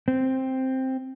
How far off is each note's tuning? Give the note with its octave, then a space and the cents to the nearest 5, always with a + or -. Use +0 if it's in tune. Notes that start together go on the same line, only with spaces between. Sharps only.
C4 +5